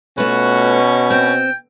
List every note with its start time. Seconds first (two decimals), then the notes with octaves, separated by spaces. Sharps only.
0.18 B2 A3 C#4 F4 F#4 B4
1.10 C4 G5